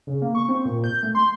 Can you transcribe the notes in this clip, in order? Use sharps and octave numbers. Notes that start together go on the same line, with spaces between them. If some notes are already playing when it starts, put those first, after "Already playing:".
C#3
A#3
C#6
C4
A#2
G6
A3
C6